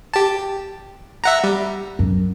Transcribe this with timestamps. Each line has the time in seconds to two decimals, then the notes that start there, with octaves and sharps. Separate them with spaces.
0.14 G4 A5
1.24 E5 F#5 A#5
1.44 G3
1.99 F#2